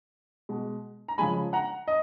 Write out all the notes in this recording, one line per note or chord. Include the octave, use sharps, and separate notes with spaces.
B2 G#3
A#5
C#3 F3 G#3 G#5 B5
F#5 A#5
D#5